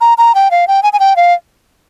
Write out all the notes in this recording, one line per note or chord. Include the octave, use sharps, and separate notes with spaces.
A#5
A#5
G5
F5
G5
G#5
G#5
G5
F5